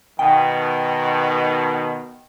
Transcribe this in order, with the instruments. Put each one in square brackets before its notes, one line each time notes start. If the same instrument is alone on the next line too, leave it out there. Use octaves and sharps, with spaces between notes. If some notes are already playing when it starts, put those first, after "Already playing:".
[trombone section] B2 D#3 [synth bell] G5